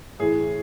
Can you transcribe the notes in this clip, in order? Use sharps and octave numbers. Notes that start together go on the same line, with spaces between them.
A2 E3 G#4